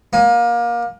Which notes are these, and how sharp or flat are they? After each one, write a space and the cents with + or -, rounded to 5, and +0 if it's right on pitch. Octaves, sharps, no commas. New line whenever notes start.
A#3 +25 G#5 +0